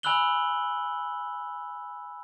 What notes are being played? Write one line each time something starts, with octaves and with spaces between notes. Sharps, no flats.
G#5 B5 E6 F#6 F#7 G7